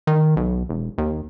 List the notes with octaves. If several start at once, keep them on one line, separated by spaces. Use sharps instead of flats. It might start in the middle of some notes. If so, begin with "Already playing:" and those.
D#3
B1
E1
D#2